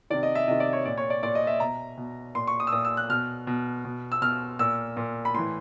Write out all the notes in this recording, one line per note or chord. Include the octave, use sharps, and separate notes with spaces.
C3 D#3 D5
D#5
E5
C3 D#3 D#5
D5
C#5
A#2 D5
C#5
D5
A#2 D5
D#5
E5
B2 A#5
B2
A#2 C6
C#6
D#6
E6
A#2 D#6
E6
F#6
B2 F6
B2
B2
E6
B2 F6
A#2 E6
A#2
B5
A2 E3 C6